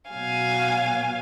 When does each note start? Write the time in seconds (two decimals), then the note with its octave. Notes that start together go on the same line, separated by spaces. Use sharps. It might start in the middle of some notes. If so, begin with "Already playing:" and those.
0.10 B2 F#3 F5 G#5